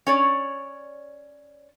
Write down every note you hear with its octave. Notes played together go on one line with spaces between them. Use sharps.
C#4 C#5 D5